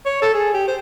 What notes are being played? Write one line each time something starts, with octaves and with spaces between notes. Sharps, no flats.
C#5
A4
G#4
G4
C5